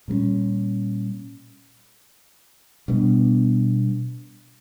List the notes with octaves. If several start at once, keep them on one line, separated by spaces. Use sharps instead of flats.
A#2 G3 A#3 C#4
B2 G3 B3 D4